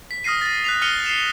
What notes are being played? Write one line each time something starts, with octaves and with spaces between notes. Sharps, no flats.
B6
D#6 F6 A#6 C7 D#7
A6 A#6
F#6 B6 F7
F6 A#6 C#7 D#7 F7 G7
C7 E7